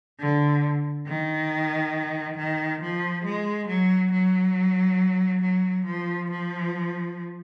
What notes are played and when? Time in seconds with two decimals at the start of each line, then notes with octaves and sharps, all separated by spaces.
0.20 D3
1.07 D#3
2.38 D#3
2.81 F3
3.25 G#3
3.68 F#3
4.12 F#3
5.42 F#3
5.86 F3
6.30 F3